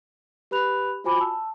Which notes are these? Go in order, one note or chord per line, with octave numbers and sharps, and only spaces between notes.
G4 B4 B5 F#6 F7
F4 F#4 C5 G#5 B5 D6
A5 E6